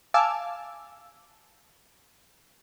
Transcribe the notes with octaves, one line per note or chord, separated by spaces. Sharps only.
F5 G#5 A5 D6 E6